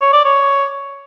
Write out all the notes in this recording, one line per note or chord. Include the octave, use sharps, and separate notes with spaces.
C#5
D5
C#5